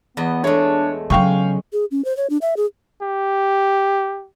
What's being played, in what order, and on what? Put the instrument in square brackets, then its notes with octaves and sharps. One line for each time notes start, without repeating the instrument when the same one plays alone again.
[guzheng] E2 D#5 [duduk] B3
[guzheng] G#3 A3 [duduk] D4 [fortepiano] C#5
[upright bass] C#3 F#3 [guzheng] G#3 [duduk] C#4 [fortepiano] F5 G5 C#6
[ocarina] G#4
C#4
C5
C#5
D4
E5
G#4
[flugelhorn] G4